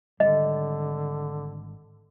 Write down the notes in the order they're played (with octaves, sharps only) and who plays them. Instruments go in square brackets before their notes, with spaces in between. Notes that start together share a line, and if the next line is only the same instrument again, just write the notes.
[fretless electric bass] G#1 G3 [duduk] D3 [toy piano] D#5